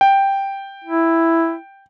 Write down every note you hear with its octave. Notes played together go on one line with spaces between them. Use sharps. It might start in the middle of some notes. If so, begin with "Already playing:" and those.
G5
E4